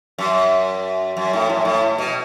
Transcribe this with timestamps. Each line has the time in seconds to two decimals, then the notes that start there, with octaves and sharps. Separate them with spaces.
0.19 F#2
1.17 F#2
1.33 A2
1.50 F#2
1.65 A2
1.98 B2